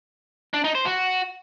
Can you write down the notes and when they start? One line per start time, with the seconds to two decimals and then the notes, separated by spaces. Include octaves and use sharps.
0.54 D4
0.64 D#4
0.75 C5
0.86 F#4